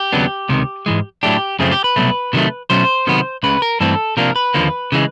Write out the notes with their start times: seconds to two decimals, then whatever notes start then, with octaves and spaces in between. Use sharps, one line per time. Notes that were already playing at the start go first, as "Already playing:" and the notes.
Already playing: G4
0.13 D#2 C#3 F#3 B3 D4
0.49 C#2 C3 D#3
0.86 G#2 E3 G#3
1.23 A2 F#3 A3 D4 G4
1.59 F#2 C#3 F3 A3 C4 G#4
1.71 G4
1.84 B4
1.96 C2 B2 F#3 A3
2.33 C3 D#3 F#3 A3
2.70 B2 F#3 A3 C#4 C5
3.07 C3 D#3 F#3 B3
3.43 C#2 C#3 B4
3.62 A#4
3.80 G2 E3 A3 C4 A4
4.17 C3 F3 A#3 D4 A#4
4.36 B4
4.54 D#2 D3 F3 A#3
4.92 C#3 E3 G#3